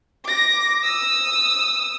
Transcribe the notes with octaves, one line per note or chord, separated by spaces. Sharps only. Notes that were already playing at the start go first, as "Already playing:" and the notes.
D6 A#6
D#6 E6